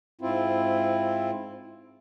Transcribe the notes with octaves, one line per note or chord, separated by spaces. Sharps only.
G#2 C4 E4 F4